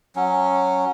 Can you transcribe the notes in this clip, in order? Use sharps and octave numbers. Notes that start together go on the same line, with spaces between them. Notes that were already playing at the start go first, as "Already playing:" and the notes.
F#3 C#4